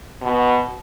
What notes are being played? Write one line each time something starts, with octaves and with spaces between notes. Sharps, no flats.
B2